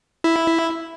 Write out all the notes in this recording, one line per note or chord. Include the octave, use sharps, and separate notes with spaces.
E4